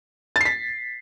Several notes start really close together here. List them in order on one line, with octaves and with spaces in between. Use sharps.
A6 C7 B6